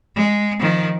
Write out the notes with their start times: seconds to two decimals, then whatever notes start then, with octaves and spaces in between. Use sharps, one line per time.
0.15 G#3
0.59 D#3 F3